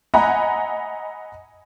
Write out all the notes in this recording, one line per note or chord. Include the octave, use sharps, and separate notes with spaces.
D#5 E5 F#5 G#5 A#5 B5